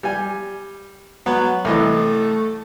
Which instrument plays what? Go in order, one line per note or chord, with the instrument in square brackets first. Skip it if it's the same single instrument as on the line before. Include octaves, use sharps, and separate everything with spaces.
[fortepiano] G3 G#5
[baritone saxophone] F#3 [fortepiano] B3
[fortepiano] C2 E3 D#5 [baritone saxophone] A3